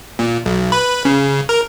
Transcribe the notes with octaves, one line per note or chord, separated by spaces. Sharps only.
A#2
B1
B4
C#3
A#4